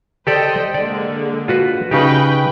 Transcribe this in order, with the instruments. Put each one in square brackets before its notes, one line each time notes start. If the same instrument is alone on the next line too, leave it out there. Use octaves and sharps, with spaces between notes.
[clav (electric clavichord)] G4 A4 D5 [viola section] C5 D#5 G5
[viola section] D3 G#3 A#3 [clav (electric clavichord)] D5
[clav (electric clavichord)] F4 F#4 B4
[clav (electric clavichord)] C#3 D#4 G4 [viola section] B4 G5